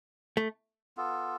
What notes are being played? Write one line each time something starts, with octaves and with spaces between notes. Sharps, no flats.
A3
B3 F4 A4